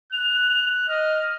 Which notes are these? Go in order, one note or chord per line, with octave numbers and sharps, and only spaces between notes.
F#6 F7
D#5 F6